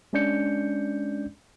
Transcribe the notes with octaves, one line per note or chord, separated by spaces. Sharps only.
G#3 C#4 D4 D5 G6 C#7